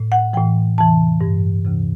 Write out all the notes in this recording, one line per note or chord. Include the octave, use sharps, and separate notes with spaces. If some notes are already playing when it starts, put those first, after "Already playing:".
Already playing: A2
F#5
A2 E3 G5
E2 C3 E3 A5
G2 E3
D2 C3 E3